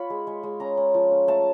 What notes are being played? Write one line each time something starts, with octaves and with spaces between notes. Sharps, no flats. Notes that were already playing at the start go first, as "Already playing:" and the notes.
Already playing: F4 C#5 B5
G#3
G#3
G#3
C#4 A#5
C#4
F3
C#4
A3 A5